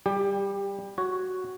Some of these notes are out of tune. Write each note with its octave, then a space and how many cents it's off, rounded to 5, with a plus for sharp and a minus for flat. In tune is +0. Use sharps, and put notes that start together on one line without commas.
G3 +0 G4 +20
F#4 +0 C#5 +0